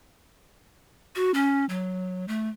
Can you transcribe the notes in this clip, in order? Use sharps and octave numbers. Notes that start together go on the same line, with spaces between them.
F#4
C#4
F#3
A3